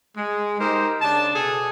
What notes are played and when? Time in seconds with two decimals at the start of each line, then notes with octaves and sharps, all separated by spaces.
0.16 G#3
0.59 D#4 G4 A#4 C5
1.01 C#3 D4 A5
1.35 B2 G#4 A4